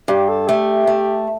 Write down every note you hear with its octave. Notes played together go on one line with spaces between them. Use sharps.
G2 G4
A4
A3 G4
A3